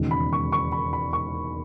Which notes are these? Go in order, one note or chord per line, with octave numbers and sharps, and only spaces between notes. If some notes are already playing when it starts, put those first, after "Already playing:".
Already playing: E1 D#2 C#3 G#3 D#4
B5
C#6
C#6
B5
B5
C#6